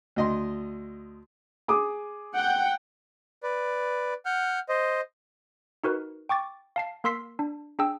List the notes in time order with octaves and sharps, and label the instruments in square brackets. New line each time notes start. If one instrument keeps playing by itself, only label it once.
[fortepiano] D2 D#5 C6
[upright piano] G#4 D6 D#6
[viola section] F#5 G5
[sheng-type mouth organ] B4 D5
F#5 F6 G6
C5 D#5
[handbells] D#4 F#4 A#4 B4
G5 C#6 D6 A6
F5 A5 C7
A#3 A#4 C6 E6 B6 C7
D4
D4 G#4 G5 E6